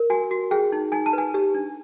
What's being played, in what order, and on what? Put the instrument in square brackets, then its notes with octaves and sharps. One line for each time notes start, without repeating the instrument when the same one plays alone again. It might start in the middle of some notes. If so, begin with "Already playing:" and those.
Already playing: [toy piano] A#4
F#4 G#5
F#4
G#4 G5
D#4
D#4 G#5
A5
B4 G#5
G4
D4